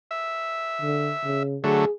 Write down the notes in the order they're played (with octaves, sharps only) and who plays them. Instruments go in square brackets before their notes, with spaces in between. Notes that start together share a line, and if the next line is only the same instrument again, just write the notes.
[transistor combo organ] E5
[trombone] D3
C#3
[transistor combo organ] D3 F#3 A3 [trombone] G#4